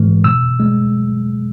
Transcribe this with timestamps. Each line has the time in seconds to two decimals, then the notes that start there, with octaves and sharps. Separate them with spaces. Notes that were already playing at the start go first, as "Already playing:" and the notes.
Already playing: G#2 E3 G#3
0.24 B2 E6
0.60 G#3